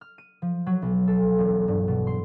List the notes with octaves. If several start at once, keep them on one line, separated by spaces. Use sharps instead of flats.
F6
D#7
F3
F#3
B1
A4
E1
G2
B2
C6